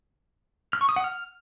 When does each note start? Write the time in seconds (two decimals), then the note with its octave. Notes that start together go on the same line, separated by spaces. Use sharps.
0.73 F6
0.81 C#6
0.89 D#6
0.96 F#5
1.04 F6